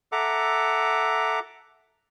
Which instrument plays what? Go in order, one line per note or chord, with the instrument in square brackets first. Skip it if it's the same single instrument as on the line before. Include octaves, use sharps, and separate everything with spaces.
[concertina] A4 E5 F#5 A#5 D6